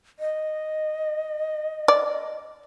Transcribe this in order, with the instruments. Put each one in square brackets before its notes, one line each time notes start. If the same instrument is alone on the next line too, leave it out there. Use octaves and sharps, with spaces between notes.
[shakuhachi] D#5
[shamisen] D5